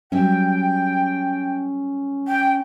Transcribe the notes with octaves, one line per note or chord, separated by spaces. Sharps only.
F#3 G3 C#4 E5 G5
G5